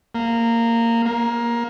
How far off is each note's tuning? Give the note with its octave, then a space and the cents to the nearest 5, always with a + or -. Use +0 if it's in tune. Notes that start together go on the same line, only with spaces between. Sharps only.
A#3 -15
A#3 +15